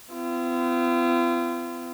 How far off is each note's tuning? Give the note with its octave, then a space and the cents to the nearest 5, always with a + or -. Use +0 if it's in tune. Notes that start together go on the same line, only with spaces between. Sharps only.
C4 -45 F4 -40